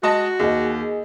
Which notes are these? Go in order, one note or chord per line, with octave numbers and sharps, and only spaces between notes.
G#3 F#4 D#5 A5
D#2 G#4 D#5